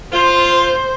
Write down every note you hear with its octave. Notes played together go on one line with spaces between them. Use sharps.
F4 C5